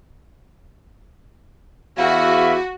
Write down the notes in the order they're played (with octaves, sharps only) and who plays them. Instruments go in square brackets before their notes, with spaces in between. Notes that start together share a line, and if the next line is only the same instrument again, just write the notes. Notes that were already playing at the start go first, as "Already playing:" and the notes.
[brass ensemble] E2 E5 [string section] F#4 [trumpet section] G4 G#5 B5 [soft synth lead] F5